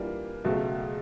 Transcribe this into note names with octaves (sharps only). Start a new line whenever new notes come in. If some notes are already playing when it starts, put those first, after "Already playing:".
Already playing: E3 G3 A#3 D4 F4
C#2 B2 F#3 A3